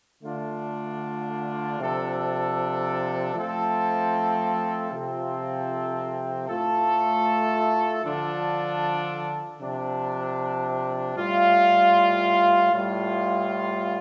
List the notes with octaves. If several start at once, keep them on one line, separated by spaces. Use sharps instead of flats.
D3 A3 D4 F4
C3 F3 D4 A4
F3 A3 C4 A4
C3 F3 C4 F4 A4
A2 A3 F4 A4
D3 F3 D4 F4 A4
C3 F3 D4
A2 G3 F4
A2 G3 F4